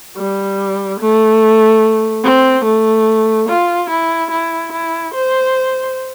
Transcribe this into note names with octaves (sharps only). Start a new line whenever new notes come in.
G3
A3
C4
A3
F4
E4
E4
E4
C5